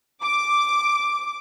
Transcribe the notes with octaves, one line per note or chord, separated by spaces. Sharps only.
D6